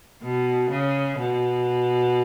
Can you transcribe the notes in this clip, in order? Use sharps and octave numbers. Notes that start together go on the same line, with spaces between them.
B2
C#3
B2